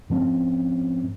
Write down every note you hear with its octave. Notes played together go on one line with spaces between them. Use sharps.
G#2 F3 C4 C#4